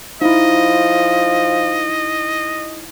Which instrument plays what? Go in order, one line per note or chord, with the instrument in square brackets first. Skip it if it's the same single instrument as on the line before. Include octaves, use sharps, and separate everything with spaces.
[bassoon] F3 [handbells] D#4 E4 [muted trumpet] D#5